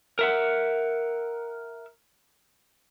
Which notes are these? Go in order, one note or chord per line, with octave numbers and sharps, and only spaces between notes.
A#4 E5 F#5